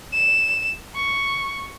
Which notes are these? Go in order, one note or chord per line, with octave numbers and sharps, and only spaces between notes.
E7
C#6